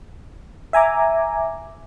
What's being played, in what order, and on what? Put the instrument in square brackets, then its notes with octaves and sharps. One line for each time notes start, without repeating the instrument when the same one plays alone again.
[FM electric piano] E5 G#5 A#5 D6